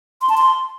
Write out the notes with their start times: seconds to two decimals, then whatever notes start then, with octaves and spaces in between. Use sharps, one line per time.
0.22 C6
0.29 A5
0.37 C6